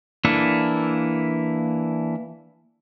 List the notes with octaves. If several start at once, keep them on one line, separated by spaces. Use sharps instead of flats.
E3 A#3 D4 E4 A4